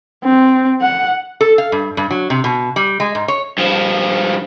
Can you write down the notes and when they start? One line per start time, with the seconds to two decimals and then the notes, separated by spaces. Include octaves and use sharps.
0.24 C4
0.82 F#5
1.41 A4
1.58 F5
1.72 G2
1.97 G2
2.11 F#3
2.30 C3
2.44 B2
2.76 G3
3.00 G#3
3.15 G#2
3.28 C#5
3.58 G2 F3